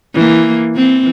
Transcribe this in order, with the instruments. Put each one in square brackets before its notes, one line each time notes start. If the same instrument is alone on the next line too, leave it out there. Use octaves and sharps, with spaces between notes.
[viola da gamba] E3 A#3
E3 C4